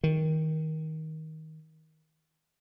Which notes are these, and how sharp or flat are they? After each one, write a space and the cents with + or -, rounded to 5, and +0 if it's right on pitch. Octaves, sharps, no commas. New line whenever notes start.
D#3 +20